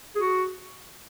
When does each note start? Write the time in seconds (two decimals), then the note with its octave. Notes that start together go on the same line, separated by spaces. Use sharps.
0.16 G#4
0.19 F#4